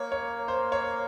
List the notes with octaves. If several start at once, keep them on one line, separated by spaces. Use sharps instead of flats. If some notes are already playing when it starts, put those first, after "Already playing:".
Already playing: A#3 C#5
C#5
C5
C#5